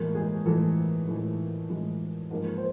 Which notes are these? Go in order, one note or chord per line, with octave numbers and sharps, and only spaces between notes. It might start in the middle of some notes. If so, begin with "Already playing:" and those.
Already playing: A2 E3 G#3 A#3 A#4
G#3 G#4
A2 E3 G#3 A3 A4
A2 E3 G#3
A2 E3 G#3
G#2 F3 G#3 A#3 A#4
C5